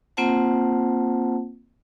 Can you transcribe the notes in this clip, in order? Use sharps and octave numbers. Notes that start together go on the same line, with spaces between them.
A#3 C4 F4 C5 F#5 A5